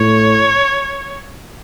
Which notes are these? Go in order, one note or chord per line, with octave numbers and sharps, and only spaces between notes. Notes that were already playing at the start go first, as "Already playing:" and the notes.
Already playing: A2 C#5